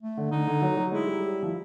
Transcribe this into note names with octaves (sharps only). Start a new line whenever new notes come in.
A3
D3
D3 D#4
D3
F#3
F#3
G#3 E4
G3
F3 E4